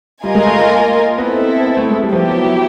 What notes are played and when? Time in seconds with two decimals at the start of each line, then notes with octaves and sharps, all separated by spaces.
0.23 G3 F4 A#4 D#5 G#5
0.35 G#3
0.46 A3
0.59 A3
0.71 A#3
1.18 B3 C4 E4 A4
1.66 B3
1.77 A3
1.90 G#3
2.01 G3
2.13 F3 B3 E4 G4
2.29 F#3
2.44 F#3